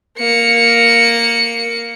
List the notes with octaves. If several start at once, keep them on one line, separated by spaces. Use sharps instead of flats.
A#3 C#7